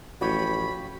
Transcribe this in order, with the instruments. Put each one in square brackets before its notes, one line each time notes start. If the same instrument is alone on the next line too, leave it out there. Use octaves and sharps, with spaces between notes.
[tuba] A1 [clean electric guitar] F3 G4 C#5 [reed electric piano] F#4 [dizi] B5